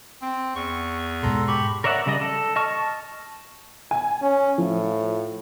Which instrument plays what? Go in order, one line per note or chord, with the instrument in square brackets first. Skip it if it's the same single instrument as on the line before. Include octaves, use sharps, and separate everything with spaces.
[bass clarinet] C4
[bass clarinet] E2 [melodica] C#6
[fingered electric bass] G#2 B2 [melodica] A4 A#5 C6
[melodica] G4 B5 C#6
[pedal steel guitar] A#4 C#5 D5 E5 F#5
C#3 G3 D5 D#5
A4
D#5 A5 C#6 F6
[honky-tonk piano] G#5
[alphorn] C#4
[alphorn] A2 [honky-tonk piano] F3